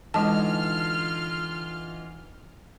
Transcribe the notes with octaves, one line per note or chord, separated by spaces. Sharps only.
D3 E3 G#3 D#4 F4 A5 F6